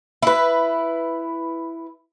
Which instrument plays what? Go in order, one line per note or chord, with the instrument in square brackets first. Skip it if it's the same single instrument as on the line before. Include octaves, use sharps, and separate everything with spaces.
[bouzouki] E4 B4